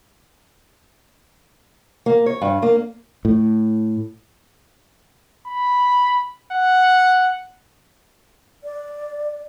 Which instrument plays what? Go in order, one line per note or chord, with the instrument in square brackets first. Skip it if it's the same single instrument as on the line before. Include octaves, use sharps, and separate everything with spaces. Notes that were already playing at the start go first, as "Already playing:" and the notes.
[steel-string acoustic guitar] A#3
C#5
G2
A#3
[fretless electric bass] A2
[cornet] B5
F#5
[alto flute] D5